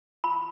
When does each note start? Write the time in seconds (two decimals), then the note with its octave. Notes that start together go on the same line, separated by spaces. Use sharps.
0.24 B5